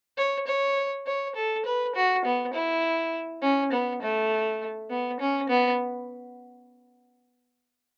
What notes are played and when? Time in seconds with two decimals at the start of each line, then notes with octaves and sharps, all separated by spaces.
0.17 C#5
0.47 C#5
1.07 C#5
1.36 A4
1.65 B4
1.95 F#4
2.25 B3
2.54 E4
3.42 C#4
3.72 B3
4.02 A3
4.90 B3
5.20 C#4
5.49 B3